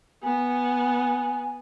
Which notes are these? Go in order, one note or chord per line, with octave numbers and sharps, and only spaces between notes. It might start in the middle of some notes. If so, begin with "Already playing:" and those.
B3 G#5